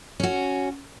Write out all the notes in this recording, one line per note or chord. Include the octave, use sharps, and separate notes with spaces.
C#4 F#4